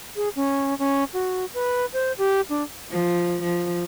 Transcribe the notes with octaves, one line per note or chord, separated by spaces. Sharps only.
G#4
C#4
C#4
F#4
B4
C5
G4
D4
F3
F3